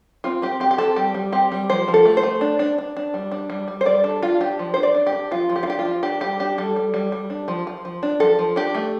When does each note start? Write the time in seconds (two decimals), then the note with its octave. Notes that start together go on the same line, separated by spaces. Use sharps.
0.24 C4 F4
0.42 C4 G4
0.60 C4 G4
0.71 G4
0.78 C4 A4
0.96 G3 G4
1.14 G3
1.32 C4 G4
1.52 G3
1.70 F3 C5
1.88 F3
1.94 A4
2.05 A3
2.17 C5
2.23 A3
2.41 D4
2.59 D4
2.78 D4
2.97 D4
3.14 G3
3.32 D4
3.50 G3
3.68 G3
3.81 C5
3.86 G3 D5
4.04 D4 A4
4.23 D4 F4
4.41 D4 G4
4.59 F3
4.74 D4 C5
4.83 D5
4.95 D4
5.07 G4
5.13 D4
5.31 F3 F4
5.49 F3
5.56 G4
5.63 F4
5.67 D4 G4
5.79 F4
5.86 F3
6.03 D4 G4
6.21 G3 G4
6.40 D4 G4
6.58 G3 A4
6.76 G3
6.94 G3
7.12 G3
7.30 D4
7.48 F3
7.67 F3
7.85 F3
8.03 D4
8.20 F3 A4
8.39 F3
8.56 D4 G4
8.75 A3